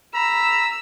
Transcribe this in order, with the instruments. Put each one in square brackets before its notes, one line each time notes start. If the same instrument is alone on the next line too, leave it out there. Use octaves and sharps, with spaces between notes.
[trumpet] A#5 [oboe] B5 [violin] E6